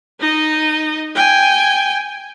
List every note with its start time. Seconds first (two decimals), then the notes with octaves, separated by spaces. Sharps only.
0.20 D#4 D#5
1.15 G5 G#5